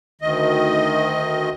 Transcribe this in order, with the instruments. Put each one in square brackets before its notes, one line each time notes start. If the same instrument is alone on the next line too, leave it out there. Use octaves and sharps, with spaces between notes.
[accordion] D2 D#3 D#5